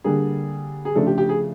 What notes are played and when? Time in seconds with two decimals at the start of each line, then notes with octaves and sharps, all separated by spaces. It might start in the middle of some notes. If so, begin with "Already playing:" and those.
0.04 D3 G3 A#3 G#4
0.85 G#4
0.95 C#3 F3 A3 D4 A4
1.07 G4
1.18 G4
1.29 G#4